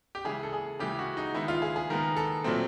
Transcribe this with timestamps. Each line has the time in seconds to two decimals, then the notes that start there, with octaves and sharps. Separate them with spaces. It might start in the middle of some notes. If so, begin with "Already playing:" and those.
0.15 G4
0.24 C#3 E3 G#3 G#4
0.43 A4
0.53 G#4
0.79 C#3 E3 G#3 G4
0.99 F#4
1.17 D#4
1.35 D#3 G#3 B3 E4
1.48 F4
1.62 G#4
1.76 G#4
1.90 D#3 G#3 B3 A#4
2.17 A4
2.44 A#2 F#3 A3 C4